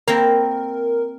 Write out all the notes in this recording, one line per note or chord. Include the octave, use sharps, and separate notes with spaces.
A#3 C4 E4 A#4